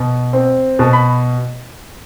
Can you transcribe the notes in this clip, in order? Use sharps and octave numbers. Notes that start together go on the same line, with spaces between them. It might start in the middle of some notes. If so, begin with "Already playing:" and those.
Already playing: B2
C4
B2 A5
B5